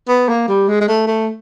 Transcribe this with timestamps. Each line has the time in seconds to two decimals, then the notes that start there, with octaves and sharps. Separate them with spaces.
0.08 B3
0.29 A#3
0.48 G3
0.68 G#3
0.81 G#3
0.88 A3
1.07 A3